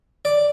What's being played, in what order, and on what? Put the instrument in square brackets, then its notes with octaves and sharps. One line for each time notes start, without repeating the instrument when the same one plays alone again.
[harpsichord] D5